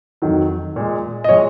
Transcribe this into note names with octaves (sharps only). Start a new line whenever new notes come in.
F2 D#3 F#3
A#2 G#3
D#5
A#2 F3 G#3 C#5